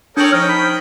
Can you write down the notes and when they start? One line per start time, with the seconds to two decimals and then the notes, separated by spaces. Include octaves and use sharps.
0.17 D4 A4 A#4 C#5 G5 D#6 F#7
0.32 F3 C#4 D#4 G5 F6
0.48 B5